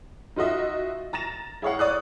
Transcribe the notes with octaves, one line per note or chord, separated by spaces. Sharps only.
D#4 F4 F#4 D#5 E5
A#5 A6 A#6 E7
E4 G#4 C#5 F5 F#5
C#5 D5 D#6 F#6